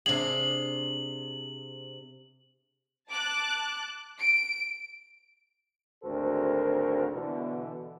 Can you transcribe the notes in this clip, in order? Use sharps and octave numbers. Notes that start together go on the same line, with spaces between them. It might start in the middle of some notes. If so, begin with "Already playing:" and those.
C3 D4 G#4 F#7
A5 D6 F#6
D7
G#1 D2 F#4 A4 A#4 C5
B2 D3 E3